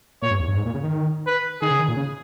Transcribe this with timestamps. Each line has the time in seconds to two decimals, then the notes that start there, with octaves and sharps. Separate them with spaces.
0.22 A#2 C#5
0.31 G2
0.40 E2
0.48 G2
0.57 G#2
0.66 A#2
0.74 C#3
0.83 D#3
1.27 B4
1.61 D#3 G#4
1.71 C#3
1.79 D#3
1.88 A#2
1.97 C#3